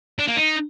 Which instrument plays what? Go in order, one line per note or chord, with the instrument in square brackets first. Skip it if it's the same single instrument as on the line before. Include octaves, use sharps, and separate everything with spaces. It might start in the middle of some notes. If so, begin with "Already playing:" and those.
[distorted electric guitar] D4
A#3
D#4